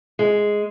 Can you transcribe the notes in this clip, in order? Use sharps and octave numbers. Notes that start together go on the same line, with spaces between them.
G#3